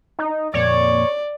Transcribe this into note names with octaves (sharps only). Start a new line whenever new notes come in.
D#4
F2 A#2 A#3 C#5 D5